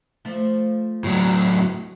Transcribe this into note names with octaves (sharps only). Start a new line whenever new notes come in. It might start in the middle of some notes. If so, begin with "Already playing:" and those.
F3 A3
A2 F#3